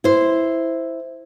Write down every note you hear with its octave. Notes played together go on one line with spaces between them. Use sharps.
E4 C5